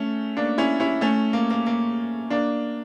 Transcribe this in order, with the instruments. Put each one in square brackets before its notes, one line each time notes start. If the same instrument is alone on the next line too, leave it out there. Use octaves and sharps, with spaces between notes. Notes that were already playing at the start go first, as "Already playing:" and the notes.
Already playing: [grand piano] A3 C#4
A#3 D4
C#4 E4
C#4 E4
A3 C#4
A#3
A#3
A#3
A#3 D4